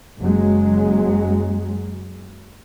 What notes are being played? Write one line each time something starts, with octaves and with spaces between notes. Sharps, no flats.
F#1 F#3 G#3